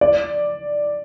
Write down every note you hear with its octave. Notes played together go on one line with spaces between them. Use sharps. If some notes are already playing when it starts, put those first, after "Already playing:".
D5